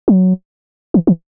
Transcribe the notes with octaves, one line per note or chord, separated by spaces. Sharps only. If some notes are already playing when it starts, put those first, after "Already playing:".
F#3
E3
E3